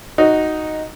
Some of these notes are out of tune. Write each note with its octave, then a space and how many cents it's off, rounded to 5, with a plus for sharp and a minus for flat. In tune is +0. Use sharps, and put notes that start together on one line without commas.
D#4 +0 F#4 +0